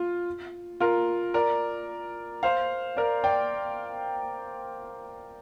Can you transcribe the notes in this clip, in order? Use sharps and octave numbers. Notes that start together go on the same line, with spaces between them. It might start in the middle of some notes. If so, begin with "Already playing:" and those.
Already playing: F4
F4 A#4
A#4 D5
C5 F5
A#4 D5
D5 G5